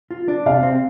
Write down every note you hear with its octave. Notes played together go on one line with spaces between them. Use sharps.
F4
D4
C3 F5
C4